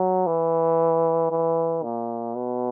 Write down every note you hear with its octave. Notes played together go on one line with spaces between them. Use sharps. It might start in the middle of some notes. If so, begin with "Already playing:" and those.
Already playing: F#3
E3
E3
A#2
B2